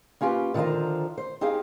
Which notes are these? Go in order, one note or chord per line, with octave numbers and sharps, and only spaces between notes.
A#3 C#4 F4 G4 B4
D3 D#3 F3 F4 C5 A#5
C5
C4 D#4 G4 G#4 F5